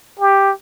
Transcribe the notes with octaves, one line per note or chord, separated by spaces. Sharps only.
G4